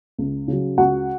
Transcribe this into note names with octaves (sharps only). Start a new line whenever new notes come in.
C#2
C#3 F#3
C#2 F#4 F#5